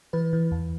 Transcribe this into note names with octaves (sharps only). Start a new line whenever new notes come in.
E3 B4
E3
E2